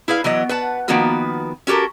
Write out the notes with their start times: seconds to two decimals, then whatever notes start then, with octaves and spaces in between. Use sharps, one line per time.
0.08 E4 G#4 B4 F5
0.24 E3 F#3 B3 D#5
0.49 B4 F#5 A5
0.88 D#3 F3 A#3 B3 F#4 B4
1.67 C#4 F#4 G4 A4 A#4